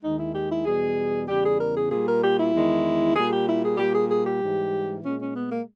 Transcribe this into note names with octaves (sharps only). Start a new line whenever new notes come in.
D#2 D#3 G#3 D#4
E4
G4
E4
E2 B2 G3 G#4
E2 C#3 G3 G4
G#4
A#4
G#4
A#2 G3 G#4
A#4
G4
E4
E2 D#3 G#3
A#2 G3 G#4
G4
E4
G#4
A#2 G3 G4
G#4
G#4
G4
G#2 E3 G3
A#2 G#3 C#4
C#4
B3
A#3